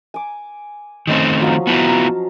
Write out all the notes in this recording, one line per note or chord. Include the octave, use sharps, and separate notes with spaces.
G#5 D6
D#3 A3 C4 C#4 C#5 D#5
F3 F#3 F5
B3 E4 F4 A5 A#5